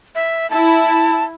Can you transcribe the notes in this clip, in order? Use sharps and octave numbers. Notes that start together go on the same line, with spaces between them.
E5
E4 A5